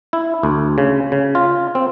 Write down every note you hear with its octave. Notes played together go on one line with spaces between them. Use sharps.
E4
D2
C#3
C#3
F4
C4